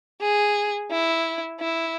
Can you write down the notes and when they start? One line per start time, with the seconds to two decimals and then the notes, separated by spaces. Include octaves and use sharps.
0.21 G#4
0.91 E4
1.60 E4